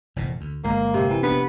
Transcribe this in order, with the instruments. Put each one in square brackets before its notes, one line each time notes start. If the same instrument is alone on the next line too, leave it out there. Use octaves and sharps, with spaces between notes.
[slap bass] F1 E2 A#2
D2
[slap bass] G1 G#3 [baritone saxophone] A#3
[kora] C3
[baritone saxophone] E3
[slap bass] F1 D4 [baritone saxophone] B3 [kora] B4